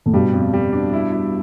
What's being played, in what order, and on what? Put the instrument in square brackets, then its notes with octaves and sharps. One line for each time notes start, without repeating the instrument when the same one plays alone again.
[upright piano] A2
[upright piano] G2 B2 [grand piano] G3
[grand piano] F2
G3
D4
E4
E4